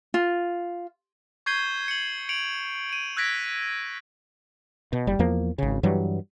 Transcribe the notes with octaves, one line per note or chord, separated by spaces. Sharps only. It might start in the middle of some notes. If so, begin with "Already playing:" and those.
F4
C#6 G6 G#6 C7 D#7 G7
C#7 F#7
C#7 D7 F7 F#7
D7 D#7
E6 F#6 G#6 A#6 B6 D7
B2
F#1 G3
E2 F3 A#3
G#1 C#3
G2 E3 F#3 G3